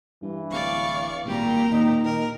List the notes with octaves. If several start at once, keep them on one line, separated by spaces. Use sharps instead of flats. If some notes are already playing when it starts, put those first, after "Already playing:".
G2 E3
D1 D5 F5 C#6
G#1 A#2 G3 G4 A#5
D#2 D#4
D#3 A#4